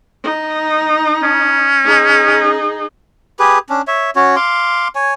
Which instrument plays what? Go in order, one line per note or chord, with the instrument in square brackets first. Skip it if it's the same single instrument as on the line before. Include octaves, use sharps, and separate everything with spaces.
[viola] D#4
[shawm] C#4
[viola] D#4 G#4
[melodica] G4 G#4 B4
C#4 D4
C#5 E5
C#4 F#4 C#5
F5 C6 D6
C#5 G#5